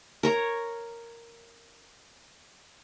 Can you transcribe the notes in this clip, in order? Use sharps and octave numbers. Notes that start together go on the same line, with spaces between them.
A#4 C#5 A#5